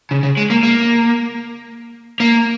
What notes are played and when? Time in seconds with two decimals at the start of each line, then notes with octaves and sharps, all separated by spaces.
0.11 C#3
0.23 C#3
0.37 G#3
0.50 A#3
0.63 A#3
2.20 A#3